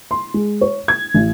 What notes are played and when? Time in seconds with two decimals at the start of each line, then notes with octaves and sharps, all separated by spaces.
0.11 C6
0.34 G#3
0.61 C#5
0.88 G#6
1.14 A1